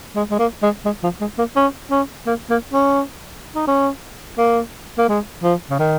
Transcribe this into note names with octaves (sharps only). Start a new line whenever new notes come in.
G#3
G#3
A#3
G#3
G#3
F3
G#3
A#3
C#4
C#4
A#3
A#3
C#4
D#4
C#4
A#3
A#3
G#3
F3
C#3
D#3